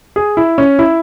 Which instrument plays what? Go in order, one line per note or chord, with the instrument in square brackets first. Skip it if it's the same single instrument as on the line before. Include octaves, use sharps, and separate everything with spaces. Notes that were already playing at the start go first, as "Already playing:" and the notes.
[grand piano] G#4
E4
C#4
E4